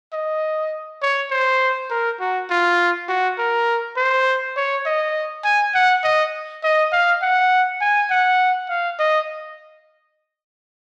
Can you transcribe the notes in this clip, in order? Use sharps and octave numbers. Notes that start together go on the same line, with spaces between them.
D#5
C#5
C5
A#4
F#4
F4
F#4
A#4
C5
C#5
D#5
G#5
F#5
D#5
D#5
F5
F#5
G#5
F#5
F5
D#5